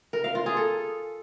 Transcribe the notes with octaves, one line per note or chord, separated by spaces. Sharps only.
A#4
F5
F4
G#4
A4